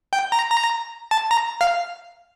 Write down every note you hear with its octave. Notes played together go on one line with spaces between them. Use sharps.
G5
A#5
A#5
A5
A#5
F5